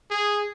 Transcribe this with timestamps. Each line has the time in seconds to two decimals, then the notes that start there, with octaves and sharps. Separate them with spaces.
0.10 G#4